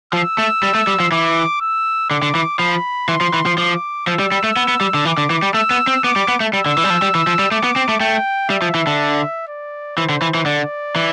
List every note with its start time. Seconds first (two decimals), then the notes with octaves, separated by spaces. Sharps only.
0.13 F3 E6
0.38 A3
0.63 G3
0.75 A3
0.87 G3
1.00 F3
1.12 E3 D6
1.61 E6
2.10 D3 D6
2.22 D3
2.35 E3
2.59 F3 B5
3.09 E3 C6
3.21 F3
3.34 E3
3.46 F3
3.58 F3 D6
4.07 F3 E6
4.19 G3
4.32 G3
4.44 A3
4.57 B3
4.68 B3
4.81 G3
4.94 D3
5.05 E3 D6
5.18 D3
5.30 E3
5.43 G3
5.54 A3 E6
5.71 B3
5.87 C4
6.04 B3 D6
6.16 G3
6.28 B3
6.40 A3
6.53 G3 E6
6.66 D3
6.78 E3
6.84 G3
6.90 F3
7.02 G3
7.15 E3
7.27 F3
7.39 G3
7.51 A3 D6
7.64 B3
7.76 C4
7.89 A3
8.00 A3 G5
8.50 G3 E5
8.62 F3
8.75 E3
8.87 D3
9.48 D5
9.97 E3 C5
10.09 D3
10.22 E3
10.35 E3
10.46 D3 D5
10.96 E3